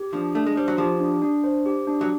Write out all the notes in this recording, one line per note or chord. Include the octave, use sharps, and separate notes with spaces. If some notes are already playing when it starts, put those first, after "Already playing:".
Already playing: G4
F3 D4
A3 D4
G#3
G3 C5
F#3
F3 G4
D4
D4
C5
G4
D4
F#3